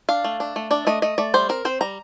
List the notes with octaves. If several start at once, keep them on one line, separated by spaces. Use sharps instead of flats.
D4 F5
A3
D4
A3
D4 D5
A3 D#5
A3 D#5
A3 D5
G3 C5
C4 A#4
C4 C5
G3 A#5